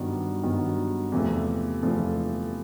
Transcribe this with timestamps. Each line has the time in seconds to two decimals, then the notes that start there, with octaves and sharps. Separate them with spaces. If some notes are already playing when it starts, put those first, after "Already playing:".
Already playing: G2 D#3 F#3 B3
0.43 G2 D#3 F#3 B3
1.12 E2 C3 F3 A3
1.82 E2 C3 F3 A3